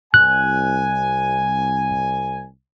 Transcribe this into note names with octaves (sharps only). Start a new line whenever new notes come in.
C2 G#5 F#6